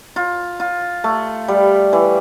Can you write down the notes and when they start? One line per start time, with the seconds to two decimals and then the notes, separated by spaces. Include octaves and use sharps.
0.16 F4
0.60 F4
1.04 A3
1.48 G3
1.93 E3